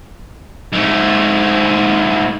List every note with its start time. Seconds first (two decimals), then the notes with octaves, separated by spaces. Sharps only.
0.73 G#2 A3